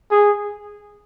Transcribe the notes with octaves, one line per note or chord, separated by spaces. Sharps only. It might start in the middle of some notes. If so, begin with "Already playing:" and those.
G#4